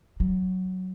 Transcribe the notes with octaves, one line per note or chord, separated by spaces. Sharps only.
F#3